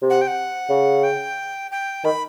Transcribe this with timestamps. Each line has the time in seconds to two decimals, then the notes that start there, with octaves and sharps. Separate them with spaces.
0.02 C3
0.10 F#5
0.21 G5
0.28 F#5
0.70 C#3
1.03 G5
1.71 G5
2.05 D#3 B5